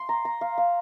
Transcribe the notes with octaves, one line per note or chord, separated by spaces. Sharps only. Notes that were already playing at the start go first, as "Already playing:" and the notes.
Already playing: C6
A#5
A#5
F5
F5